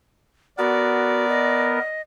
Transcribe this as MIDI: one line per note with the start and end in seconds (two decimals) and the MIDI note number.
0.58 1.79 59
0.58 1.25 66
0.58 1.79 70
0.58 1.98 74
1.29 2.01 75